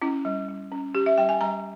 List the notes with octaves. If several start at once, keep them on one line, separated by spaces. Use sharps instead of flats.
C#4 E4
G3
G3
C#4
C#4 G4
E5
G3 G5
G#5
G3 A#5